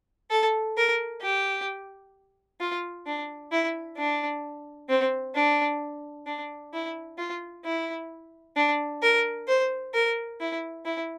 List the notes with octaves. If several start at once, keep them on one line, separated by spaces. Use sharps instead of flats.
A4
A#4
G4
F4
D4
E4
D4
C4
D4
D4
E4
F4
E4
D4
A#4
C5
A#4
E4
E4